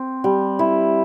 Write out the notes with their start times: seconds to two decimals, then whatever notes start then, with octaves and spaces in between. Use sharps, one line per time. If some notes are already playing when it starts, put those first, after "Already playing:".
Already playing: C4
0.24 G3
0.59 E4